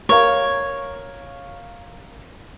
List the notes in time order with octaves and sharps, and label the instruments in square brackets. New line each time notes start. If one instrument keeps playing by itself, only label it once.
[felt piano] A#4 F5 [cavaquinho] C#5